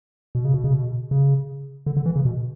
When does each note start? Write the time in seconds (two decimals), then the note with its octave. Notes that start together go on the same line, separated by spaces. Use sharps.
0.35 B2
0.45 C#3
0.54 B2
0.64 C#3
0.73 B2
1.11 C#3
1.86 D3
1.97 D3
2.06 E3
2.16 C#3
2.25 B2